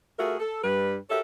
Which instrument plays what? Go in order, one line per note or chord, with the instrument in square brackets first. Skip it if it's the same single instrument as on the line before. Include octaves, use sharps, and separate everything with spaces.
[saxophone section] A3 F4 F#4 G#4 A#4 E5
A4
G2 G3 B4
F#4 G4 A4 A#4 C#5 E5